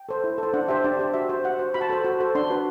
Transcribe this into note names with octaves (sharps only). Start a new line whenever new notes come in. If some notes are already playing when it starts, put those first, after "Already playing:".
Already playing: G5
A4 C5
E4
A4 C5
D4 F#5
G4 C5 E5
D4 D5
G4 C5
F#4 E5
C5
F#4 F#5
C5
F#4 B5
A5
A4 C5 B5
F#4
A4 C5
D4 C6
F#4 B4